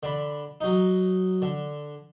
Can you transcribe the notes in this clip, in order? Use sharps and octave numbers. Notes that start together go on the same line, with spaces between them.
D3 D5 B5
F#3 D#4
D3